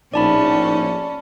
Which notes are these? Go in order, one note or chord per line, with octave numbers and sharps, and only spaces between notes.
A#1 A2 C#4 D#4 D5 A5 B5